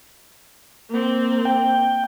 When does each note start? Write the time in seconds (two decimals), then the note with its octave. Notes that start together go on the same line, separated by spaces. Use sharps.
0.89 A#3 C4
1.45 G5